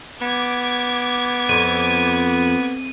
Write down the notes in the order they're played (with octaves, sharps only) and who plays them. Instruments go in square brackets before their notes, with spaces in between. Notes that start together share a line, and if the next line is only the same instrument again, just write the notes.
[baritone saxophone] B3 [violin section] D6 G#6
[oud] F2 [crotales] D#7